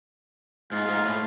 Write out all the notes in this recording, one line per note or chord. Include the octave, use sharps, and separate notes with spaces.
G#2 F4
G#2
A2